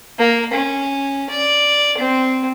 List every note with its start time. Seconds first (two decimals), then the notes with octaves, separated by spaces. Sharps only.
0.19 A#3
0.53 C#4
1.30 D5
1.98 C4